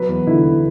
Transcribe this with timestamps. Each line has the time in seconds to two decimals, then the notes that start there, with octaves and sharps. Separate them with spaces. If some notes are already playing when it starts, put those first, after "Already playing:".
Already playing: F#3 B4
0.09 E2
0.27 D3 E4